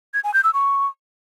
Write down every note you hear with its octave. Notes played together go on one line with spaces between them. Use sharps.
G#6
G#5
G6
E6
C#6